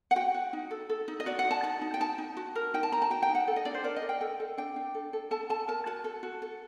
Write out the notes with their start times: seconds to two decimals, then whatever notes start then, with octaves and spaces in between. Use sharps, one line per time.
0.11 F#5
0.16 F#4 G5
0.34 F#4
0.53 D#4
0.71 A4
0.90 A4
1.08 D#4
1.20 D#5
1.26 F#4 D5
1.39 F#5
1.45 F#4
1.51 A5
1.63 D#4 A5
1.82 D#4
1.94 G5
2.00 D#4 A5
2.18 D#4
2.37 F#4
2.55 A#4
2.74 D#4 G5
2.83 A5
2.92 D#4 A#5
3.02 A5
3.10 F#4 G5
3.22 G5
3.29 D#4
3.35 F#5
3.48 A4
3.56 D#5
3.65 D4 D5
3.74 C5
3.84 A#4 D5
3.96 D#5
4.02 A#4
4.09 G5
4.21 A4 G5
4.40 A4
4.58 D4 G5
4.76 D4
4.95 A4
5.13 A4
5.31 A4 A5
5.49 A4 A5
5.68 A#4 A5
5.86 F#4 A5
6.04 A4
6.23 F#4
6.42 A4